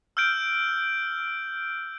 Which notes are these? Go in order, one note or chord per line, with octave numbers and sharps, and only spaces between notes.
E6 F6 G6 D7